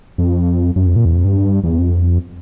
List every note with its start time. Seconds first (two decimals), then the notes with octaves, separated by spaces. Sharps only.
0.18 F2
0.76 F#2
0.86 F2
0.96 A#2
1.05 E2
1.15 F2
1.25 G2
1.64 E2
1.79 F2